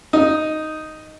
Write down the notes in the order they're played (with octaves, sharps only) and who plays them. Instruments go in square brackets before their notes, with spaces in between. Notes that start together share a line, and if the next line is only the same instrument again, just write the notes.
[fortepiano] D#4